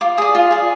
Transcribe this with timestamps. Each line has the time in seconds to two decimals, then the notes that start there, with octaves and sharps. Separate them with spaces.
0.01 F4 D6
0.17 G#4 D5 D#6
0.35 F4
0.51 G#4 D5